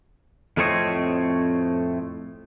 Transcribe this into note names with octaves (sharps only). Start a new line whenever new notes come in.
F2 A2 A3 C4 C#5 D#5